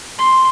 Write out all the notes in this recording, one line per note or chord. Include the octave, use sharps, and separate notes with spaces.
C6